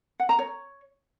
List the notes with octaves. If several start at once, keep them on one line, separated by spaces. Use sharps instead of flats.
F#5
A#5
C#5